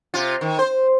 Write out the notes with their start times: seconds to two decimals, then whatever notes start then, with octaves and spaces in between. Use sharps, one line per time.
0.14 C3 F4
0.41 D#3
0.59 C5